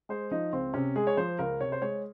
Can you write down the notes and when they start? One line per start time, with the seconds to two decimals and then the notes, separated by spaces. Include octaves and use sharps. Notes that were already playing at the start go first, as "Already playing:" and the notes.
0.09 G#3 C5
0.31 F3 D#4
0.53 C#2 C4
0.74 C3 C#4
0.96 G#3 G#4
1.07 C#5
1.17 F3 C5
1.39 C#2 A#4
1.60 C3 C#5
1.72 C5
1.82 G#3 C#5